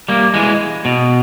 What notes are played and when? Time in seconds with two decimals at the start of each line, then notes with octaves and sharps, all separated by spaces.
0.08 G3 A#3
0.34 E3 G#3
0.85 B2